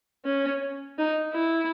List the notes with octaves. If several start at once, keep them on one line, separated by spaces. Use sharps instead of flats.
C#4
D#4
E4